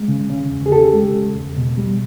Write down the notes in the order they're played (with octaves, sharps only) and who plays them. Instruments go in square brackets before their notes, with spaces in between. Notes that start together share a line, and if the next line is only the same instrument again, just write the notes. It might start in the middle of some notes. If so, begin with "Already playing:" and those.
Already playing: [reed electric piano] G#3
C#3
C#3
E2
G#4
C#3 G4 A4
G#3
C#3
E2
B2
G3